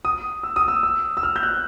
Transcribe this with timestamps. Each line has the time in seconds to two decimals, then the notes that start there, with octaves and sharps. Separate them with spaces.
0.05 D#6
0.43 E6
0.56 D#6
0.68 E6
0.83 E6
1.17 E6
1.23 F6
1.36 G6
1.43 F#6